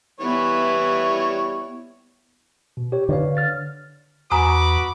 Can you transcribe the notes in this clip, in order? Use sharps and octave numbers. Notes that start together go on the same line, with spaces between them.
E3 G3 B3 E4 C#5
B2
G4 C#5
D3 B4 C#5 F5
F6 A6
E2 F#4 B4 G#5 A#5 B5 D6 D#6